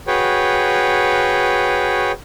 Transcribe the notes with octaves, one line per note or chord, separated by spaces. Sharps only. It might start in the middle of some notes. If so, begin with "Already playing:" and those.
F#4 G#4 B4 C#5 G5